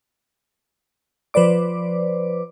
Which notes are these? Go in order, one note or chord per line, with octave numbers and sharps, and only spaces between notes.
F3 B4 C5 D5 D6